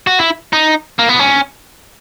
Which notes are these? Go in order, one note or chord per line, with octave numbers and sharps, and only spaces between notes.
F#4
E4
D#4
A#3
B3
C#4